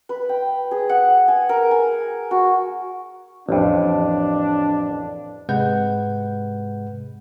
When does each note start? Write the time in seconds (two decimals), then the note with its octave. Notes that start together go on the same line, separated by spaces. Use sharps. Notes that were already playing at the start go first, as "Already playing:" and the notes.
0.09 B4
0.29 G5
0.71 G#4
0.89 F#5
1.28 G#5
1.49 A#4
1.71 G#5
2.31 F#4
3.49 A1 F2 D4
5.49 G#2 C3 G#3 B4 F#5 G6